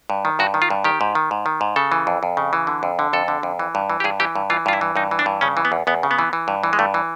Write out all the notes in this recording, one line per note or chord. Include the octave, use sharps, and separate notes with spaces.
G2
D#3
G2 F#4
D#3
F4
G2
D#3 G4
G#2
D#3
G#2
D#3
G#2
C#3 A4
E3
F2
F2
C#3
E3
D3
F2
D3
F2 A4
D3
F2
E3
G2
E3
G4
G2 G#4
E3 G4
G2
E3 F4
G2 F4
E4
E3
G2 D#4
E3
D4
G2
C#3 C#4
E3
B3
E2
E2 B3
C#3
B3
E3
E3
G2
E3
G#3
G2 A3
E3